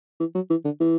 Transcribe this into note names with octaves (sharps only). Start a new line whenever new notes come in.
E3
F#3
E3
D3
E3